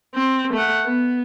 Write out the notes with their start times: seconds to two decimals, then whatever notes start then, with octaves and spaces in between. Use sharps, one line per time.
0.15 C4
0.54 A3 F#5
0.85 B3